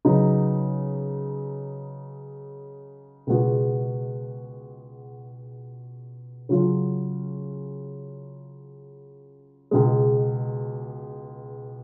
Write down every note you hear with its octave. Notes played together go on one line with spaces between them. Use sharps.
C#3 F#3 B3 D#4
C#2 B2 G#3 B3 F#4
C#3 F#3 C#4 F4
C#2 B2 G#3